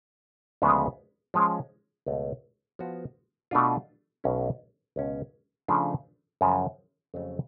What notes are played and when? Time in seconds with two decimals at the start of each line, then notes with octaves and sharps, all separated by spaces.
0.62 D2 C#3 F3 G#3 B3
1.34 F3 G#3 C#4
2.06 C#2 B2 A3
2.79 F3 B3 F#4
3.51 B2 A3 D4 F4
4.24 B1 B2 A3 C#4
4.96 C#2 B2 G#3 C#4
5.68 C#3 F3 A3 D4 F4
6.41 F#2 C#3 F3
7.14 F2 C#3 F#3 A3